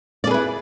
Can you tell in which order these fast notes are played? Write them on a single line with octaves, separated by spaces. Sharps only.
D5 G#4 B4 E4